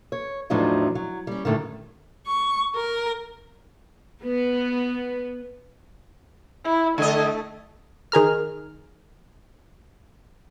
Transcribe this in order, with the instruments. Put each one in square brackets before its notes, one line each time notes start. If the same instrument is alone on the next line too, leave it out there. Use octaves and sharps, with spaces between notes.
[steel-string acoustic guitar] C#5
E2 A2 F3 F#3 D4 D#4
F#3
G3 C#4
F#2 A2 D3 D#3
[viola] C#6
A#4
[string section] B3
[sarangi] E4
[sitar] D3 D#5 [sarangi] A3
[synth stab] D#3 G#4 A#4 F6